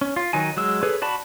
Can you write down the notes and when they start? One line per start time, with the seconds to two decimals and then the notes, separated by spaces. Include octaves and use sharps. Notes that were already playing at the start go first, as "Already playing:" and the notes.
0.01 C#4
0.16 F4
0.33 D#3 F#3 D#4 G#5
0.57 F#3 G#3 E6
0.83 G#4 A4 B4 C#5
1.02 F#4 D5 A5 B5